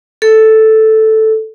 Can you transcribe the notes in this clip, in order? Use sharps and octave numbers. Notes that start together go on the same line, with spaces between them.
A4